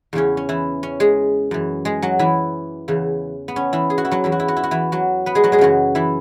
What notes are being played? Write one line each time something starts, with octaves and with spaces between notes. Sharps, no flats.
E2 C#3 E3 C#4
C#4
E3 E4
C#4
G#3 G#4
F#2 E3
G#3 G#4
F#3 F#4
E3 E4
E2 C#3 E3
B3
C#4
E3 E4
G#4
F#4
E4
F#3 F#4
E2 E3 E4
F#4
E4
F#4
E4
F#4
E3 E4
F#3 F#4
B3 B4
G#3 G#4
F#3 F#4
G#3 G#4
F#2 C#3 E3 F#3 F#4
E3 E4